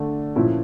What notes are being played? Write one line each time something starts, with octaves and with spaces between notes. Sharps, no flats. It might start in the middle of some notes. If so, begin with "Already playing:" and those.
Already playing: D3 A3 D4
A#2 F3 C#4 E4